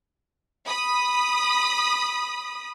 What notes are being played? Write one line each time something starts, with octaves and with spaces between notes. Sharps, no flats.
B5 D#6